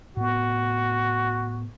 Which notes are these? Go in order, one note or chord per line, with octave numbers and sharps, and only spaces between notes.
A2 B3 F#4